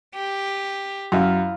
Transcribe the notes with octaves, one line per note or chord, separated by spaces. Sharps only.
G4
F#2 E4 E5 F5